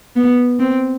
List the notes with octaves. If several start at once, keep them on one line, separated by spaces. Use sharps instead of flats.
B3
C4